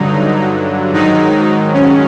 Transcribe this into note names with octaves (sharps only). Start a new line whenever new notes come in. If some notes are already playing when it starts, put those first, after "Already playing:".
Already playing: G2 D3 F#3 D#4
G#2 D#3 F#3 D#4
C#4